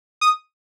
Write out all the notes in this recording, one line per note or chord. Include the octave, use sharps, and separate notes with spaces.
D#6